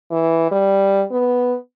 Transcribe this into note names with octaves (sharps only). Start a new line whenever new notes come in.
E3
G3
B3